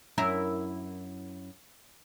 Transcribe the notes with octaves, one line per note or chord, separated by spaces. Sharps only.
F#2 E4 A#4